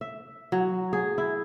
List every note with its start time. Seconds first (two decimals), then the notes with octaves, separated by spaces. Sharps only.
0.01 E5
0.52 F#3
0.93 G#4
1.18 E4